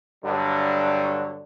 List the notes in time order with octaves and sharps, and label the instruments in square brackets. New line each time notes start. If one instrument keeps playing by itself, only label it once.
[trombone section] G2 D3 F#3